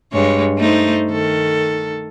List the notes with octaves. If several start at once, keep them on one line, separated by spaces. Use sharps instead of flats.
G2 G#3 C#5
A3 D#4 C5
D#3 A4